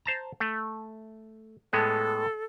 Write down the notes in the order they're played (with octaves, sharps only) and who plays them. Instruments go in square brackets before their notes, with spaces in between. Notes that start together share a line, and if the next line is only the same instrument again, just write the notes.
[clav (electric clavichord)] C5 A5 A#5
A3
[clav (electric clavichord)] A2 G#3 B3 [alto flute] A4